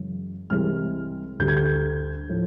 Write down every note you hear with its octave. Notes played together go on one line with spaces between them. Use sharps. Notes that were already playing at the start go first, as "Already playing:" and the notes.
Already playing: F#2 C#3 E3 G#3
C2 C3 E3 G#3 F6
D2 D3 G3 G6
G#6
G6
A2 F3